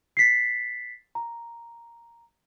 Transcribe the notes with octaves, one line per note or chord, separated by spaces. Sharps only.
A6 B6 C7
A#5